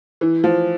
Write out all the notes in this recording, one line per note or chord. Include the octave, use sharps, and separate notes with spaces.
E3
F3